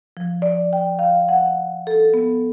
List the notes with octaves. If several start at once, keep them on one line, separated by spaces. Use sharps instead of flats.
F3
D5
G5
F5
F#5
A4
B3